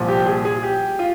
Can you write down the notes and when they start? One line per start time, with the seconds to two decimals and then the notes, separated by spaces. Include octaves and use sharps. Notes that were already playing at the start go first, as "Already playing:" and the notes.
Already playing: C2 A#2 F3
0.09 G4
0.26 G#4
0.45 G#4
0.63 G4
0.99 F4